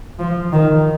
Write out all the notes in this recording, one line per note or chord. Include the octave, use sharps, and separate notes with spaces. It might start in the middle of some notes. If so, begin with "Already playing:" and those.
F3
D#3